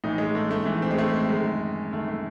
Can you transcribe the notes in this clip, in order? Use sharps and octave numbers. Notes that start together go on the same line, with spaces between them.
A2 E3 D#4
G#3
A3
A3
A2 E3 A3
C4
G#3
A3
C4
F#2 D#3 G#3
F#2 D#3 A3
A3